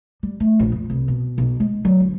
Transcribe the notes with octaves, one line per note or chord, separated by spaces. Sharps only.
G3
A3
A#1
F2
C2
B2
B1
G#3
F#3
G1